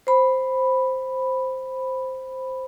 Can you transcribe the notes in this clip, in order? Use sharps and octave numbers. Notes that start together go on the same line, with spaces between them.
C5 B5